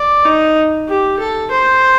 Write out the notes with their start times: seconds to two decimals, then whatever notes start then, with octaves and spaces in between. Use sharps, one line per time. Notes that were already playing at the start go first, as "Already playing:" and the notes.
Already playing: D5
0.25 D#4
0.88 G4
1.19 A4
1.51 C5